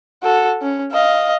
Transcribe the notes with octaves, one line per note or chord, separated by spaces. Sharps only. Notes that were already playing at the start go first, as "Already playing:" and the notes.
F#4 A4
C#4
D#5 F5